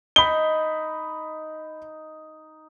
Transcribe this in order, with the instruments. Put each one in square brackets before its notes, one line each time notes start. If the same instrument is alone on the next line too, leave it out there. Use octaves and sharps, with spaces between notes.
[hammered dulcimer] D#4 [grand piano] B5 G7